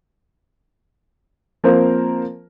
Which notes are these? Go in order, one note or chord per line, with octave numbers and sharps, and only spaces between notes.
F3 A#3 C4 A#4 C5